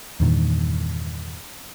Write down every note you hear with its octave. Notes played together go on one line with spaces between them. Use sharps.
E2 G2 A#2 D#3